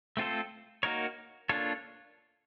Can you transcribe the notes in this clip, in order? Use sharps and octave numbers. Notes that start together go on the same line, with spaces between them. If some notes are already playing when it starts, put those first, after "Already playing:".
A3 C4 F4 A4 C5
A#3 D#4 F#4 A#4 C#5
A#3 D4 F4 A4 C#5